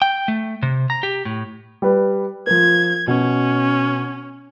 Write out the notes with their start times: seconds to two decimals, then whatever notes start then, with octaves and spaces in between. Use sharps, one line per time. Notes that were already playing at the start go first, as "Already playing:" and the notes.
0.02 G5
0.28 A3
0.63 C3
0.90 A#5
1.03 G4
1.25 A2
1.82 G3 B4
2.47 F3 A#4 G#6
3.07 B2 C#4